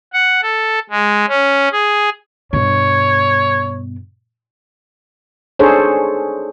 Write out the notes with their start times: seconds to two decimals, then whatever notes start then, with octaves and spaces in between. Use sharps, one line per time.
0.14 F#5
0.43 A4
0.90 G#3
1.29 C#4
1.72 G#4
2.53 G2 B2 C#5
5.59 D4 D#4 G#4 A4 C5 C#5